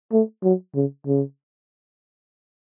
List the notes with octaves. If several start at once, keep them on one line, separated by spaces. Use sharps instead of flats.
A3
F#3
C#3
C#3